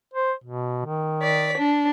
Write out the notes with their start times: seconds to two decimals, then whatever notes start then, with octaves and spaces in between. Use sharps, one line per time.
0.14 C5
0.44 B2
0.86 D#3
1.22 D5 B6
1.58 D4